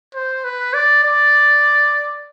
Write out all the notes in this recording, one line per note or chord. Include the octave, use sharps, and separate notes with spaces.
C5
B4
D5
D5